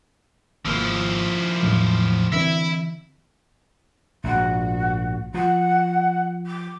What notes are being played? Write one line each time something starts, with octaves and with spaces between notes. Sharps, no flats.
G#1 F3 A#3 E4
E2 A2 F#3
D3 E3 C4 E4 E5
A#1 G#2 F#4
F3 F#5
D6